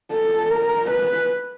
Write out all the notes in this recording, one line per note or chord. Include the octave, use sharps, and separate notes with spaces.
A4
A#4
B4